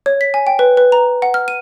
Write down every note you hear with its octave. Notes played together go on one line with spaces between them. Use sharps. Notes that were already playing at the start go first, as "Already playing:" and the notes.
C#5
B6
G#5
G5
B4
B4
A#5
F#5
F6
D#7